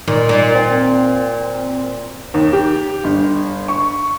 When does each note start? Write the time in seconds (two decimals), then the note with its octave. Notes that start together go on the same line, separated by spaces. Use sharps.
0.08 A#2 D#3
0.29 A#2
0.55 C4
2.34 D#2
2.53 G4
3.04 G1
3.68 C#6